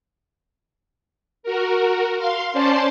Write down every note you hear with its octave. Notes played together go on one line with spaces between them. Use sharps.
F#4 A#4
F5 C6
C#4 C5 D5 A5 C6